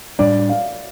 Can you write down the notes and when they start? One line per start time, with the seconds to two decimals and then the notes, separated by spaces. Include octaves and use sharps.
0.19 A2 G3 D4 D5
0.49 F5